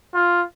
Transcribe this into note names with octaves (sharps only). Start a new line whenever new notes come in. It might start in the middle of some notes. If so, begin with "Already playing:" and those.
F4